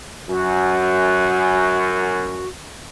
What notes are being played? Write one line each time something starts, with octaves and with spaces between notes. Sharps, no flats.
F#2 F#4